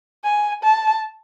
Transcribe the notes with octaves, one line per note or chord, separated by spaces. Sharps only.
G#5
A5